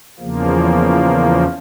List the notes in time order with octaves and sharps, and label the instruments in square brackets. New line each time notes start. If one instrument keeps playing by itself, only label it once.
[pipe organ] E2 C#3 F3 A#3